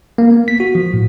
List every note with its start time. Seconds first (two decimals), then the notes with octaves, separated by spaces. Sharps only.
0.18 A#3
0.31 B3
0.48 B6
0.60 F#4
0.75 F3
0.94 A2